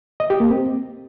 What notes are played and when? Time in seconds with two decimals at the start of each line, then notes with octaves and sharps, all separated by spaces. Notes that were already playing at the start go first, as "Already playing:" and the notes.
0.20 D#5
0.30 G4
0.40 A#3
0.50 C4